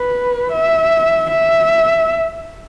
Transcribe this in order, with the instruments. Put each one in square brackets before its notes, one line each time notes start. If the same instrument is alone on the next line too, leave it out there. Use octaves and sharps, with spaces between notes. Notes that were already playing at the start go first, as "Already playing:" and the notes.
Already playing: [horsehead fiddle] B4
E5
E5